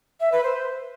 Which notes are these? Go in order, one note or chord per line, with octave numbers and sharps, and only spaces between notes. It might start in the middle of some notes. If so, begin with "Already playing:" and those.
E5
B4
C5